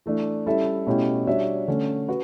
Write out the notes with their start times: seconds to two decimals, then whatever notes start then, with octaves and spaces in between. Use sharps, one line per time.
0.06 E3 A3 D4
0.46 G3 C#4 E4 A4 E5
0.86 B2 A3 C#4 E4 G4
1.27 G3 D4 F#4 C#5 E5
1.68 D3 A3 C#4
2.08 F#4 B4